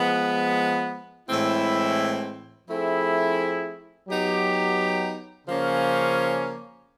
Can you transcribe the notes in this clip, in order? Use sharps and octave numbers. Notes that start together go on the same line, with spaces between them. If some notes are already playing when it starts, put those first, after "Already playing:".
Already playing: F3 G#3 B3
A2 E3 G#3 C4 E4
F3 A3 C4 E4 G#4
F#3 B3 D#4 G4
C#3 F3 A#3 C#4